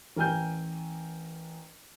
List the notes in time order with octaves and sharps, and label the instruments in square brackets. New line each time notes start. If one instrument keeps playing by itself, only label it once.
[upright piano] A1 A#4 G5 G#5 F6 G6